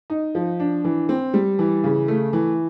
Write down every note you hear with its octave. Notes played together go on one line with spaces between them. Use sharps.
D#4
F3
D4
E3
C4
G3
E3
C#3
A3
E3